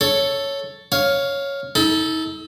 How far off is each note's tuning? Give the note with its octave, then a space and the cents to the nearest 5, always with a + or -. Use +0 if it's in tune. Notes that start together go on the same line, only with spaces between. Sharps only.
A4 +5 C#5 +0
C#5 +0 F5 +5
D#4 +40 A4 -5